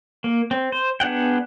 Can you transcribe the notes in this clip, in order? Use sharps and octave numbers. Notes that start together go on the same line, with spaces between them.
A#3
C4
C5
B3 D4 G#4 F#5 G5